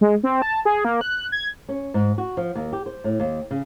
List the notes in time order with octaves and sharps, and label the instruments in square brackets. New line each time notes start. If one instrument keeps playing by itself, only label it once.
[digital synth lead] G#3
C4
A5
G#4
A#3
F#6
G#6
[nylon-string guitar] C#4
G#2
F#4
F3
D#2
G4
C5
A2
D#2
C#3